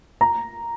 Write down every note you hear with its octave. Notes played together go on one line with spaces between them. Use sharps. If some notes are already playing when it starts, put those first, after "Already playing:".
A#5